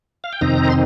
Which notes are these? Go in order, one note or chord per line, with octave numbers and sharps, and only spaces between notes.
F5
G5
F2 C3 D#3 C4 D#4 A#5
C6